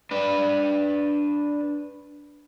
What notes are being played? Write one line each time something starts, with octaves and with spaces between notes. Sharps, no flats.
D4 B4